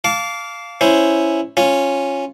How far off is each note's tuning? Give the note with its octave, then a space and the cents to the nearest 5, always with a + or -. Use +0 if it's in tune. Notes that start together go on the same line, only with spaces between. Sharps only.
F5 +0 A5 +0 D6 -30
C#4 +0 E4 +0 C5 +0
C#4 -10 F4 +0